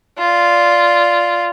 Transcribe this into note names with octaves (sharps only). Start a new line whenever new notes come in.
F4 D5